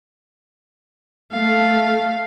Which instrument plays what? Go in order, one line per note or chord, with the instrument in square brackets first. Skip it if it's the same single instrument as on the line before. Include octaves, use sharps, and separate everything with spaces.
[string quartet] A3 A4 [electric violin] F5